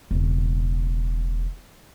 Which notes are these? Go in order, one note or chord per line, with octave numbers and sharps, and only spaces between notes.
E1 C#3